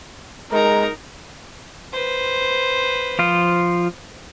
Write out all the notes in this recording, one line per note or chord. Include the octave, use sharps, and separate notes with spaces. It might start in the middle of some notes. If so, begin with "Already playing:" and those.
G#3 D#4 A#4 A#5
B4 C5
F3 F4